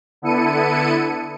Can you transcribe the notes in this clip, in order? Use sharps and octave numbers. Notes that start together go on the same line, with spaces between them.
D3 B3 E4 A4 C#7 D#7